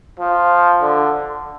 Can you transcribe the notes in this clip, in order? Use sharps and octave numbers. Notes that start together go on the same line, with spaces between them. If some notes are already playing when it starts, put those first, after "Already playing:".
F3
D3